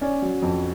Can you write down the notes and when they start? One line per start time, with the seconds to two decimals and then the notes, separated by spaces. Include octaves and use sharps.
0.01 C#4 D5
0.22 F#3
0.42 F2